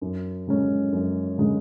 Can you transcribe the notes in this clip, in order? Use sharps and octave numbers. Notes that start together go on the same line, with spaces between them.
F#2
C#3 G#3 C#4
F#2
C#3 G#3 C#4